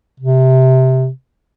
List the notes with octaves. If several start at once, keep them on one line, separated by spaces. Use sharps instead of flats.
C3